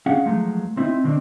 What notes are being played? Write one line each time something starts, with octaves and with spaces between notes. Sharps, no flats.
C#4 G#4 F5 F#5
E2 F3 F#3 G#3 A3
C4 D#4 E4
D3 D#3 C4 D4